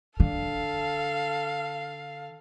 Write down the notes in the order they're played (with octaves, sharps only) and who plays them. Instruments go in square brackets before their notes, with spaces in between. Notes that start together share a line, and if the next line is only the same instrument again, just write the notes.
[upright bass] D3 [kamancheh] A4 F5